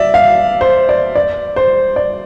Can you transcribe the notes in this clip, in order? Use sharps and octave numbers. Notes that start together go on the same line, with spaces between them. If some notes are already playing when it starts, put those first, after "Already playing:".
Already playing: D5 E5
F5
C5
D5
D5
C5
D5